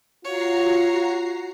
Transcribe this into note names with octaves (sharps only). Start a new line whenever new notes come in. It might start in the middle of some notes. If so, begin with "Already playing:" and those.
F4 F#4 C#5 A#5 C7